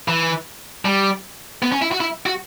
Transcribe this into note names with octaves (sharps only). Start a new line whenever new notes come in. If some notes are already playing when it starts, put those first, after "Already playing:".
E3
G3
B3
C#4
E4
F#4
E4
F#4